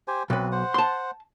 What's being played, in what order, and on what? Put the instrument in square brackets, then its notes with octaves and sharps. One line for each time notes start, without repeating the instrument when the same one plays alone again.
[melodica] G4 C5 G#5
[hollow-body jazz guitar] B1 B4 [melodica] C4
[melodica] C5 F#5
[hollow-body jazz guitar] A5 C6